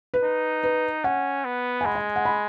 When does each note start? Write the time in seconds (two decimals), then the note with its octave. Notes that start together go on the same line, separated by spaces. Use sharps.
0.14 B4
0.23 D#4
0.64 B4
1.04 C#4 F#5
1.45 B3
1.81 G#5
1.85 G#3 B5
1.95 G#5
2.16 F#5
2.25 B5